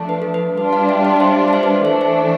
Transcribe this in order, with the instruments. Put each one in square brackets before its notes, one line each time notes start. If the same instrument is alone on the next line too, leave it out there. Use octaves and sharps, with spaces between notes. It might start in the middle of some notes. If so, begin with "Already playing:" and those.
Already playing: [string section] F3 A3 D4
[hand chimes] B4
A4
B4
[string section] G3 D4 F4 [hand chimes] B4
[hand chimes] D5 F5
E5 G5
D5 F5
D5
C5 E5
D5
C5 E5
B4 D5
[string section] E3 A3 D4 [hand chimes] C5 E5
[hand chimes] C5 E5